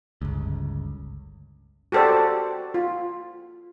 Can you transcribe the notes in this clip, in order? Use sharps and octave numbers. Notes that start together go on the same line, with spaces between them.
G1 C#2
F#4 G4 A4 C5 D5
F4